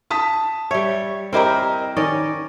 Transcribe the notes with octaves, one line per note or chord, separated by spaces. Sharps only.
A5 D#6 B6
G3 C#5 E5
C4 E4 G4 A#4 D#5 A#5
D#3 C#4 D5 D#5